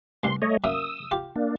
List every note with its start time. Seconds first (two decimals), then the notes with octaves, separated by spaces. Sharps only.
0.24 C2 G2 C6
0.42 A3 C#5 D#5
0.64 F#2 A#3 E5 D#6 E6
1.11 F4 G4
1.36 A#3 D4